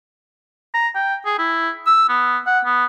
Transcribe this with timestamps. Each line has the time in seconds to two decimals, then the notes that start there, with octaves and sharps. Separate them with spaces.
0.74 A#5
0.95 G5
1.26 G#4
1.39 E4
1.87 E6
2.09 B3
2.47 F#5
2.65 B3